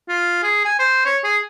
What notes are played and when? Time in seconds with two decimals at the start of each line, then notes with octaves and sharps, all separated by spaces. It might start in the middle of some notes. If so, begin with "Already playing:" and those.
0.09 F4
0.43 G#4
0.65 G#5
0.79 C5
1.05 C#5
1.24 G#4